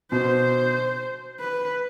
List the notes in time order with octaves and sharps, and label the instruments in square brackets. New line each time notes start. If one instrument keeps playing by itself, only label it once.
[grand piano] B2 [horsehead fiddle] C5
[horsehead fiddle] B4